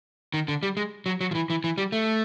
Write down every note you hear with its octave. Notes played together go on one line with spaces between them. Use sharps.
D#3
D3
G3
G#3
F#3
F#3
F3
E3
E3
E3
G3
A3